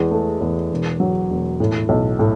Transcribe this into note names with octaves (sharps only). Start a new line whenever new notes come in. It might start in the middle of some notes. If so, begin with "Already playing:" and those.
Already playing: E2 G#3
A3
E2
E1
F#3
E1
A2
B1
A2